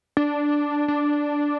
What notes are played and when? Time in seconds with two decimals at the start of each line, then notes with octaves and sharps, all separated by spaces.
0.17 D4
0.88 D4